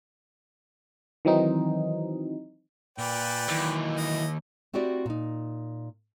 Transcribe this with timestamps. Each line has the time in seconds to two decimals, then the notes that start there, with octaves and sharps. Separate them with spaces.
1.25 D#3 E3 F#3 C4 D#4
2.98 A#2 B4 D5 G5
3.48 D#2 E3 F#3
3.97 D#5
4.73 A3 C4 E4 F#4 G4 D5
5.06 A#2 D#4